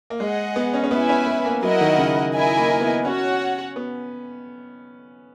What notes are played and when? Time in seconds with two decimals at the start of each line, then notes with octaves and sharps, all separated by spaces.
0.10 A#3
0.20 G#3 G#4 D#5 F#5
0.56 B3
0.73 C#4
0.84 C#4
0.91 B3 E4 B4 E5 G#5
1.09 C#4
1.26 B3
1.45 A#3
1.63 F#3 E4 A#4 D#5 F#5
1.81 D#3
1.98 C#3
2.33 E4 A#4 D#5 G#5
2.57 A#3
2.71 A#3
2.81 B3
3.04 C#4 F#4 C#5 F#5
3.76 B3